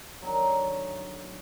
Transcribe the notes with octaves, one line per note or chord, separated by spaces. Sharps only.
D3 D#3 F#3